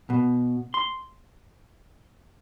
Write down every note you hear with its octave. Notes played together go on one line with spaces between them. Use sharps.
B2
C6